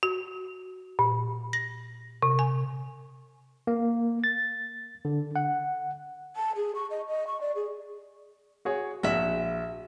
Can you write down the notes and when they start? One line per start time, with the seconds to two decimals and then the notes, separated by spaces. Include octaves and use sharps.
0.03 F#4
0.99 A#2
1.53 A#6
2.22 C3
2.39 G#5
3.67 A#3
4.24 A6
5.05 D3
5.36 F#5
6.36 A5
6.55 G#4
6.75 C#6
6.90 D#5
7.08 D#5
7.27 C#6
7.41 D5
7.56 G#4
8.65 F#4 G#4 C#5
9.03 A#1 F#4 E5